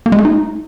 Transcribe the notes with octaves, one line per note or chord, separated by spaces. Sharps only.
A#3
G#3
A3
D#4